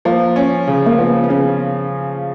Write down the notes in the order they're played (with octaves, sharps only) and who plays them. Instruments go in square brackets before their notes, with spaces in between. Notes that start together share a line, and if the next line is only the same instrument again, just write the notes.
[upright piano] F3 [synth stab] A#3
[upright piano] C#4
C#3
[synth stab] A#3
[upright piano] F3 [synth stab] B3
[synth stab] B3
[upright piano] C#3 [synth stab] C#4